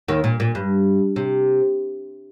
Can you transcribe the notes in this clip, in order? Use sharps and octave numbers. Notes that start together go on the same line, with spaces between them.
D#2 D#3
A#2
A#2
G2
C3